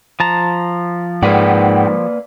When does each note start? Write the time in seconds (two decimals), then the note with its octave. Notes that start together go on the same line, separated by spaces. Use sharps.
0.20 F3 A5 A#5
1.23 G#2 A#3 B4 D5 F#5 G5